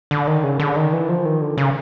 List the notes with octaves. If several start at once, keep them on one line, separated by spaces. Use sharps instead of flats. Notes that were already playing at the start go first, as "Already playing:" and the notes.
D3
D#3
C#3
D3
D#3
E3
F3
D#3
D3
C#3